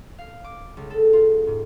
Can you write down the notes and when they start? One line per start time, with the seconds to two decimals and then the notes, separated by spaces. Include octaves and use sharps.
0.18 F5
0.44 D6
0.77 C#2
0.90 A4
1.13 F4
1.47 G#2